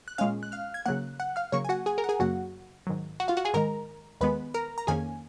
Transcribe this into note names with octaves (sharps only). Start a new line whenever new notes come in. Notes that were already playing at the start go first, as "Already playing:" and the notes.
F#6
A#2 G#3 C#4 F5 F6
F#6
F5 F6
G#6
C#3 F#3 A#3 F#5 F#6
F#5 F#6
F5 F6
C#3 F#3 A#3 C#5 C#6
G#5
F#4 F#5
G#4 G#5
A#4 A#5
F#5
G#4 G#5
F#2 C#3 F#3 A#3 F#4 F#5
G#2 D#3 F#3
F#4 F#5
F4 F5
F#4 F#5
G#4 G#5
G#2 D#3 G#3 A#4 A#5
D#2 D#3 G#3 B3 B4 B5
A#4 A#5
A#5
F2 D#3 A#3 C#4 G#4 G#5